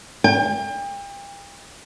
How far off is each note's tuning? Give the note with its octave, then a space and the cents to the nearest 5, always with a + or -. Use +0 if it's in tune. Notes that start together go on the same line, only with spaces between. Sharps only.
G5 +35